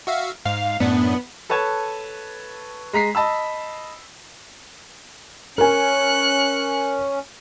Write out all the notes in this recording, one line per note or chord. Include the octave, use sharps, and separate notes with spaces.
F#4 E5 F5
G#2 F5
F#2 A2 B3 D4
A4 B4 C#5 A5 G#6
G#3 A#5 B6 C7
D#5 A5 B5 E6
C#4 A#4 G#5 F#6 C#7